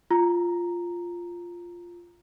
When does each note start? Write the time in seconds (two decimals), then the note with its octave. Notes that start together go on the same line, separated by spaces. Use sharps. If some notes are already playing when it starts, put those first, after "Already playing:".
0.11 F4 A#5